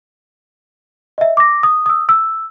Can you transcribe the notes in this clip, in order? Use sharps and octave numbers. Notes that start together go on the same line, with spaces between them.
D#5 E5
D6 A#6
D#6
D#6 E6
E6